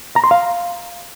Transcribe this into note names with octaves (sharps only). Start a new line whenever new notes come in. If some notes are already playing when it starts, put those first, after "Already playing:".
A#5
C6
F5